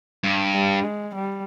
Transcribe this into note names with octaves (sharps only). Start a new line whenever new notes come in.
G2
G3
G#3
G3